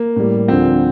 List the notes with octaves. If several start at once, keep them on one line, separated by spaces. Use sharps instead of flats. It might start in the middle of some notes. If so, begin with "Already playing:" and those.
Already playing: A#3
A2 G3
D2 D3 F3 C4